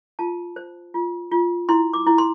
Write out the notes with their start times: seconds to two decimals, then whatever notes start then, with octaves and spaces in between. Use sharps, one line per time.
0.19 F4 A5
0.56 C5
0.94 F4
1.31 F4
1.69 E4 C6
1.93 D6
2.07 E4
2.18 C6